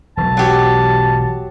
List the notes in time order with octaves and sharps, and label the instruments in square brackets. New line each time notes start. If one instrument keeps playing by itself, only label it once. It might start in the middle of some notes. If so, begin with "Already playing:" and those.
[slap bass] E1 B1 [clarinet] A5
[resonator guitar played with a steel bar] F#3 G4